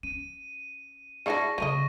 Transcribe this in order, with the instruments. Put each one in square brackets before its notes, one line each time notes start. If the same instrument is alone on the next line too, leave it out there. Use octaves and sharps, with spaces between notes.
[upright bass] C#4 [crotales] D#7
[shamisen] D4 E4 A4 [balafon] G#4 E5 F#5 [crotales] C#6 A#6
[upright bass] C#3 F#3 [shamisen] A3 A#4 D#5 [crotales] D#7